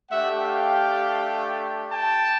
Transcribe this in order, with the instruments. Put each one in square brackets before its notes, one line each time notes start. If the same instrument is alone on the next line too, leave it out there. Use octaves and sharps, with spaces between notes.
[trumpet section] A3 D4 G4 E5 F#5
F5 G5
G5 A5